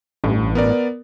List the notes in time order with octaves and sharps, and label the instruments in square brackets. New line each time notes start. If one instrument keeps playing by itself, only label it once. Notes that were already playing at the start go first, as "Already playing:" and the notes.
[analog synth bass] A1 [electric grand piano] G2
[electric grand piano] B3 A#4 D5